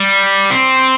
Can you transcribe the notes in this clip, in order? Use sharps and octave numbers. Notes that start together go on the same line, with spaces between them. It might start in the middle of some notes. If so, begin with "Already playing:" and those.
Already playing: G3
C4